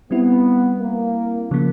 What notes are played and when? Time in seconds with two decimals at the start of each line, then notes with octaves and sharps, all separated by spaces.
0.11 G3 B3 C4 E4
0.81 A#3
1.51 C#3 F3 A#3